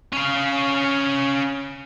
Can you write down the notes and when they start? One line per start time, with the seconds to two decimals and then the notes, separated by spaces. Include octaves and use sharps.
0.13 C#4 F5